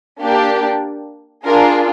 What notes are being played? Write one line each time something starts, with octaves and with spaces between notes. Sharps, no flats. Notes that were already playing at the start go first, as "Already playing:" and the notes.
A#3 D4 G4
D4 F4 G#4 A#4